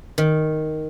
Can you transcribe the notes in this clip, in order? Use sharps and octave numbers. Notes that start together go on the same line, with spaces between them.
D#3